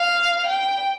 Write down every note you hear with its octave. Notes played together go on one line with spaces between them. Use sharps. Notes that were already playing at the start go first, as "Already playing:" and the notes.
Already playing: F5
G5